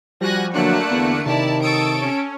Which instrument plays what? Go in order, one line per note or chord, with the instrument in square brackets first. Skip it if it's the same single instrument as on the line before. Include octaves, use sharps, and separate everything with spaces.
[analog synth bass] F3 [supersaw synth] G3 F#4 [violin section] G#5 F#6 A#6
[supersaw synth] D3 A#3 D4 [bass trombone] F#3 [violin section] A3 F#6 C#7
[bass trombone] E2 [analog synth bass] B3
[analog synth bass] C3 [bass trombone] D#3 [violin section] E4 D5 A5
[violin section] A4 C#5 D7 [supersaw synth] D#6 E6 A6
[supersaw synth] C#4